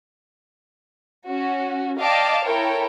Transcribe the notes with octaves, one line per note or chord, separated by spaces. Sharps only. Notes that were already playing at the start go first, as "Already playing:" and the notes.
C#4 F#4
D5 D#5 F5 G5 A5 D6
E4 A4 A#4 C#5 G5